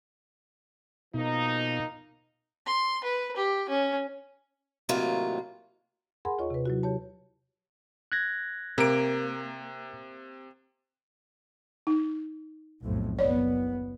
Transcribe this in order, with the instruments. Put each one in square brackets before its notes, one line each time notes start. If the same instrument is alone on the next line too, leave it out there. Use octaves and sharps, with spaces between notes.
[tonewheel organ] B2 [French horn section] F3 A#3 D#4
[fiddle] C6
B4
G4
C#4
[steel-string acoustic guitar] A2 C3 D#3 F#3 A#3 F4
[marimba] G#4 A#4 F#5 G#5 B5 C6
D#2 F4 C#5 D#5 C#6
C3 B4
F#3 E4 F#4
G4 C#5 A5
[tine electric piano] F#6 G#6 A#6
[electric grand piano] C3 D7 [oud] A#3
[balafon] D#4
[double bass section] B1 F2 A2
[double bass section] F#1 B3 [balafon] C#5 D5